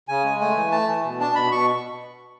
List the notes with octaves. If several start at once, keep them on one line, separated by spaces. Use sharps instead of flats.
C#3 G#5
G#3
A3 G#5
E3
A3 A5
E3
B2
D4 A5
B2 B5
B2 C#6